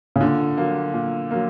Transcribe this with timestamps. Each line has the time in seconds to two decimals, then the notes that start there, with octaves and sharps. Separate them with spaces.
0.16 C#3
0.21 A#2 D3
0.58 F#3 A#3
0.94 A#2
1.31 F#3 A#3